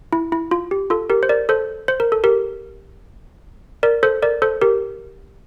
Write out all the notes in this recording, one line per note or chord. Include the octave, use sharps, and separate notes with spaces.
E4
E4
F4
G4
F4 A4
G4 A#4
C5
A#4 D5
A4 C5
C5
A#4
A4
G4 A#4
A#4 D5
A4 C5
A#4 D5
A4 C5
G4 A#4